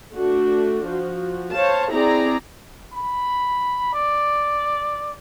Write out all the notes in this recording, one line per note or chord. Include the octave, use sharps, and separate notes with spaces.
A3 D4 F#4
F3 F#4
C5 C#5 F5 A5
C4 E4 G#4 D5 A#5
B5
D5